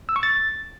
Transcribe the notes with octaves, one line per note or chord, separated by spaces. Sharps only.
E6
C#6
A6